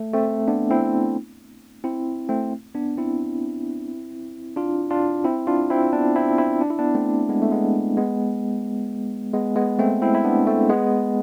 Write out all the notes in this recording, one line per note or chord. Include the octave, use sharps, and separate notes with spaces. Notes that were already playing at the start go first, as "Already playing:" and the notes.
Already playing: A3
A3 C4
B3 D4
C4 E4
C4 E4
A3 C4
B3 D4
C4 E4
D4 F4
D4 F4
C4 E4
D4 F4
C4 E4
B3 D4
C4 E4
C4 E4
D4
E4
B3 D4
A3 C4
G#3 B3
A3
G#3 B3
G#3 B3
G#3 B3
G#3 B3
A3 C4
C4 E4
E4
B3 D4
A3 C4
G#3 B3